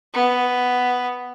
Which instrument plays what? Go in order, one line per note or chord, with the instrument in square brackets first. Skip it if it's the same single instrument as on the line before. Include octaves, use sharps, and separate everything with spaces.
[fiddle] B3